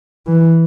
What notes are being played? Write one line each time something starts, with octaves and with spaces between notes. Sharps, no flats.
E3